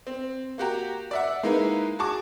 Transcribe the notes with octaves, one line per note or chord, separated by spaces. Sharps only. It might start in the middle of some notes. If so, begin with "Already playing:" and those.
C4
A#3 F#4 G4 A#5
D5 E5 F#5
G#3 A#3 D#4 E4 B4
F#4 G#4 A5 C#6 D6